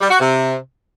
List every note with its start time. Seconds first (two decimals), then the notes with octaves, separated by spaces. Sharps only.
0.01 G3
0.10 F#4
0.20 C3